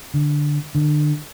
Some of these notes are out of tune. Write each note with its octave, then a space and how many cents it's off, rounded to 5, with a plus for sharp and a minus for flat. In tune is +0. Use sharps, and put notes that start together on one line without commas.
D3 +0
D3 +30